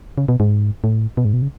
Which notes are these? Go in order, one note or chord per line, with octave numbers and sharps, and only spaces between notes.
C#3
B2
G#2
A2
B2
G#2
B2
C#3